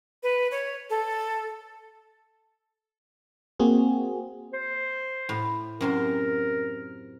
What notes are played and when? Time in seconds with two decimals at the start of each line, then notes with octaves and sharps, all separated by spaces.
0.23 B4
0.51 C#5
0.90 A4
3.60 A#3 C4 F#4 G#4
4.53 C5
5.29 A2
5.81 F#2 C3 A#4 C6